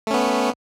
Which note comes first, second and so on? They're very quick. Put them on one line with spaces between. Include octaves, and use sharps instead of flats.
A3 C#4 B3